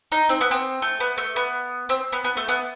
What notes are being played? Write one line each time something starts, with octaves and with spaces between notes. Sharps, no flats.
D#4
C4
B3
C4
A3
B3
A3
B3
C4
B3
B3
A3
B3